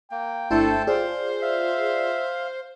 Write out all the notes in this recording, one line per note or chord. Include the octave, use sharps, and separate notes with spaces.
A#3 G5
G1 A3 D4 E4 A4 C5 A5
F4 G#4 C5 D5 F5
E5 F5